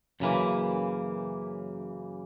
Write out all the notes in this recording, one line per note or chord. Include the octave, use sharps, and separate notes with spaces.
F#2 C#3 E3 A#3